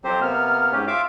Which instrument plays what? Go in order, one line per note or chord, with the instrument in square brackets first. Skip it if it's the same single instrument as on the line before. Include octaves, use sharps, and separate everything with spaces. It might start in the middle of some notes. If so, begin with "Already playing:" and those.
[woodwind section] F2 F#3 [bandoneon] C4 G4 C5
[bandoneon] C3 A#3 B3 [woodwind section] F6
[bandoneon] G#2 C#4 G4
[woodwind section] F4 [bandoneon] E5 F5 D6